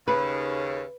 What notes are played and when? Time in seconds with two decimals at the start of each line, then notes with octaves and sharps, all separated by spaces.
0.08 D#2 C#3 B4